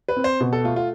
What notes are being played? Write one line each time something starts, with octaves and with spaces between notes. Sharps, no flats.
B4
C4
C5
B2
A4
A3 F4
F4